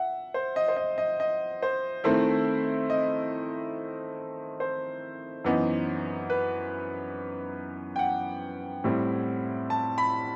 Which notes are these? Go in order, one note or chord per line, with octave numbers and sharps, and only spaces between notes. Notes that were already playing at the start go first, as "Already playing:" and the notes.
Already playing: E5 F#5
C5
D#5
C5
D#5
D#5
D#5
C5
D#3 A3 C4 E4 C5
D#5
C5
F#2 E3 B3 D#4
B4
G5
F#5
A2 G3 C4 E4
A5
B5